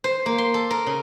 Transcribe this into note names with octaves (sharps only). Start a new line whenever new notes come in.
C5
A#3
C6
A4
A#4
C#3